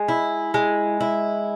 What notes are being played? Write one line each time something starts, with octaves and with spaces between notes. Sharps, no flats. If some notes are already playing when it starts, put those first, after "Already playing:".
Already playing: G#3
E4
G#3
E4